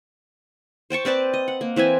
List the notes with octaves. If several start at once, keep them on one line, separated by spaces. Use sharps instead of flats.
C5 G5 A5 C#6
C4 B4 D5 A5
D#5
F#5
A#3
E3 C4 E5 G#5